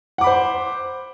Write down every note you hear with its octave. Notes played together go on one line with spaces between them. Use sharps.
C5 F#5 B5 D6